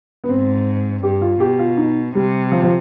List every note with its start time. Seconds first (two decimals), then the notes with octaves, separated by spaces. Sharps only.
0.24 B3
0.29 G#2 C4
1.03 G2 G4
1.22 F4
1.40 B2 G4
1.59 F4
1.77 D#4
2.15 C3 G3
2.52 F3
2.63 F3